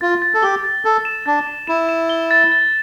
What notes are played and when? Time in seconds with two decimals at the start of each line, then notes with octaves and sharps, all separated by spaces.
0.01 F4 A6
0.22 A6
0.34 A4
0.43 G4 G7
0.64 A6
0.85 A4 A6
1.05 E7
1.26 D4 A6
1.47 A6
1.67 E4 E7
1.89 E7
2.09 G7
2.31 A6
2.52 A6